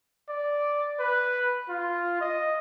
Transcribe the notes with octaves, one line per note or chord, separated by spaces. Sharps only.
D5
B4
F4
D#5